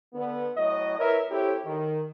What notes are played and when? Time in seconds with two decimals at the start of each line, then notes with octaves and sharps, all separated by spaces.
0.14 D3 B3
0.56 A2 F#3 D#5
0.99 E4 A#4 B4 C#5 E5
1.30 C4 E4 G4 A4 C#5
1.66 D#3